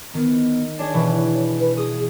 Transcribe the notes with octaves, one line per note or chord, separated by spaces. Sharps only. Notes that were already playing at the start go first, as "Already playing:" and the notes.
D#3 B3
D4 G#4 C#5
B2 E3
B4
G#4 D#6